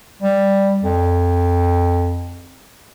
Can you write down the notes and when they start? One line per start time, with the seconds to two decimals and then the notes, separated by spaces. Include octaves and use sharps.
0.22 G3
0.83 F2